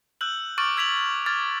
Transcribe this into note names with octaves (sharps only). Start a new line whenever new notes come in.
E6 F#6 G6 F#7
C#6 D6 F6 A6 D7 F#7
E6 G#6 B6 F7 F#7
D6 F6 G#6 A6